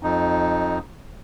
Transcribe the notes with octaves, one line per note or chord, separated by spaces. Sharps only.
F2 D#4